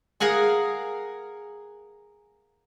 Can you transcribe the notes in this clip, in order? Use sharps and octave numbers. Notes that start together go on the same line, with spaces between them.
G#4 A#4 F5 F#5 G#5